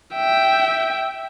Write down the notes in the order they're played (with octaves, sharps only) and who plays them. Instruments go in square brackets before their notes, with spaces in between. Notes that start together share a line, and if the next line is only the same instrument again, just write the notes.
[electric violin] E5 G5